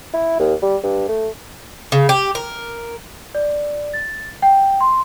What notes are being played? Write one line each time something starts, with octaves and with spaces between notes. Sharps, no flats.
E4
D#2
G3
G2
A3
C#3
G4
A#4
D5
A6
G5
C6